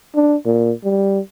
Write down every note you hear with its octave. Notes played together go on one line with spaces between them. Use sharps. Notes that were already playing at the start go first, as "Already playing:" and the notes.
D4
A#2
G3